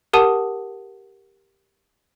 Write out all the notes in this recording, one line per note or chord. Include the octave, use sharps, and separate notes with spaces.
G4 A#4 F#5 A5 D#6 D#7